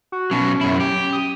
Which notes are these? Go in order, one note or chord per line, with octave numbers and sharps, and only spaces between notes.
F#4
B2 F#3 C#4
F#2 E4
G4
D#6